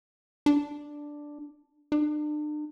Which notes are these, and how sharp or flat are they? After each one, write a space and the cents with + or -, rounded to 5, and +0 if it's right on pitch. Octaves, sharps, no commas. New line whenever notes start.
D4 +0
D4 +40